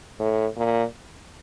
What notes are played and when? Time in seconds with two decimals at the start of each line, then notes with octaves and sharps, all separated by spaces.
0.20 A2
0.57 A#2